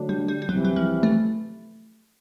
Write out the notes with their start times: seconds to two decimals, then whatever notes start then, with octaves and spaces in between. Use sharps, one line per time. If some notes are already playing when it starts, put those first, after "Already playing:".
Already playing: D3 F#3 A3 D4 F#4
0.09 G3
0.28 G3
0.42 G3
0.49 C2 C3 E3 F#3
0.65 F#3
0.76 F3
1.03 A3